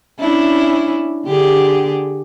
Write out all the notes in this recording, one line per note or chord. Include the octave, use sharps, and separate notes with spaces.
C#4 D4 E4
D3 G4 G#4